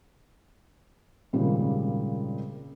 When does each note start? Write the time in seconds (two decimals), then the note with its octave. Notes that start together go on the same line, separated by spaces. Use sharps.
1.33 G#1 A#2 C#3 G3 A#3